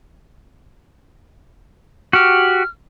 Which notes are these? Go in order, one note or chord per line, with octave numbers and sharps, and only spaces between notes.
F#4 G4 F6